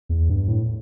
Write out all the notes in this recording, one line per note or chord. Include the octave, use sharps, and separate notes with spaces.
E2
G2
A2